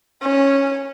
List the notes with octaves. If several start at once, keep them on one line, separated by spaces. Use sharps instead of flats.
C#4